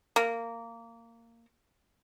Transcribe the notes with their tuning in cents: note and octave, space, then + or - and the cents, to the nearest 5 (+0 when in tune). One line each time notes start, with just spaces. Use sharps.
A#3 -15